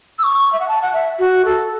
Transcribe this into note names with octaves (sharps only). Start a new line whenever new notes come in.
E6
C#6
E5
F#5
A5
F#5
E5
F#4
A4